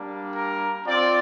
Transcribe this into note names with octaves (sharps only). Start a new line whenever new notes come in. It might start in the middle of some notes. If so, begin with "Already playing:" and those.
Already playing: G3 A#3 D4
A#4
C4 F4 D5